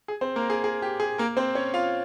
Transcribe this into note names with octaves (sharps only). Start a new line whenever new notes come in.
G#4
C4 C5
A#3 A#4
G#4
G#4
G4
G#4
A#3 A#4
C4 C5
C#4 C#5
F4 F5